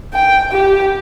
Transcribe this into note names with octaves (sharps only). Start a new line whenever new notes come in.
G5
G4